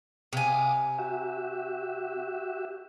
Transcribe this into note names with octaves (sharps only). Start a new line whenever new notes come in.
C3 F5 G#5 D6 D#6
F#4 G4 E5